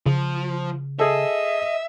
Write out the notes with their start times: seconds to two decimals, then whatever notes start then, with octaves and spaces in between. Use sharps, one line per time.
0.06 C#3 F3
0.99 G#4 A4 D#5 E5